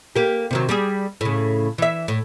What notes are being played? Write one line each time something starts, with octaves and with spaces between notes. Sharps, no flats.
A#3 G4
C3 D#3 F#3
G3 G4 G#4
A2 C#3
E3 E5
A2